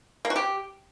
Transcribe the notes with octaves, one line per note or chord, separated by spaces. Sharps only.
A#3
F#4
G4